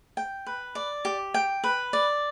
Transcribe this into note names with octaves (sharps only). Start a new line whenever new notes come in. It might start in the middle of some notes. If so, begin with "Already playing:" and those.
G5
B4
D5
G4
G5
B4
D5